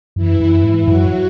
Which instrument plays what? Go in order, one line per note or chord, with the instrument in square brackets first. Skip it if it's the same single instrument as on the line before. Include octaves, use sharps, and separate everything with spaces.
[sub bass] F#2 [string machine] E3 E4
[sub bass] F#2
G#2
[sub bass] F#2 [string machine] F#3 F#4